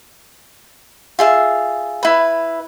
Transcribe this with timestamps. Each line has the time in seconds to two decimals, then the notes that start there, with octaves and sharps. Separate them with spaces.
1.19 F4 G#4 E5
2.03 E4 B4